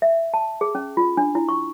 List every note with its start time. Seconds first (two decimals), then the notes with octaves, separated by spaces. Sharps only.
0.02 E5
0.34 A5
0.61 G#4
0.75 C#4
0.97 F4
1.17 D4
1.35 E4
1.49 C#6